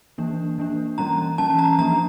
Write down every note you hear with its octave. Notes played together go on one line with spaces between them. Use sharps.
E3 A#3 D4
E3 A#3 D4
E3 G3 C#4 A#5
E3 G3 C#4 A5
A#5
F3 A#3 D4 A#5